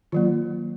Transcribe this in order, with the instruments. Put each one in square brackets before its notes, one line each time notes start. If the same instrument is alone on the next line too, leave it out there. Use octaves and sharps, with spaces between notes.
[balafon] D#3 F#3 A#3 F4